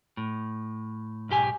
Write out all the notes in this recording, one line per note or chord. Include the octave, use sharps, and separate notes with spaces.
A2
B1 G#2 G4 G#5